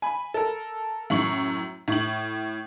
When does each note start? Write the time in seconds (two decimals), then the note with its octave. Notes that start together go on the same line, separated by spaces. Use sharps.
0.02 G#5 B5
0.34 A4 A#4
1.10 F#2 A2 C#6 F#7
1.88 A2 C#6 F#7